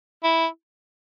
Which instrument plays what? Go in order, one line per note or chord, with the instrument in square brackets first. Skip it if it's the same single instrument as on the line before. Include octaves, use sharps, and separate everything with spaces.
[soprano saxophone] E4